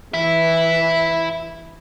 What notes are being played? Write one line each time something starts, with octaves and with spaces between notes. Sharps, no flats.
E3 E4 E5